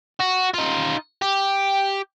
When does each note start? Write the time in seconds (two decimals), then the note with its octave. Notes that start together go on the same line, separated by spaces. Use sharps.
0.20 F#4
0.54 D#4 F4
1.22 G4